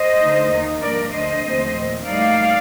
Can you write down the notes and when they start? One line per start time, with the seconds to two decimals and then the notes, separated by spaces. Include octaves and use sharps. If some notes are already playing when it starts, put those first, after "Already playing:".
Already playing: C5 D#5
0.19 D3 A3 D#4
0.50 D#2 D#3 A#3 D#4
0.81 G2 F3 A#3 D4 A#4 D5
1.12 D2 D3 A3 D4 C5 D#5
1.44 D#2 D3 F3 A3 C4
1.75 A#2 F3 C4
2.06 A2 G3 A#3 D#4 D5 F5